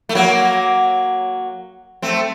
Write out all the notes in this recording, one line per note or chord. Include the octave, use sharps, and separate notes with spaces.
A3
F#3 A#3
A3 C4